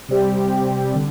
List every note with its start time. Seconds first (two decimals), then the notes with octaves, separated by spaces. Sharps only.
0.09 C3 G3 C4 G4
0.95 D3